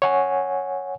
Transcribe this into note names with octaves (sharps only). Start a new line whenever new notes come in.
C#5 F#5 G#5